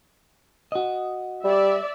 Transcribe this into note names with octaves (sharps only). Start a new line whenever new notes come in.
F#4 D#5
G3 D5 E5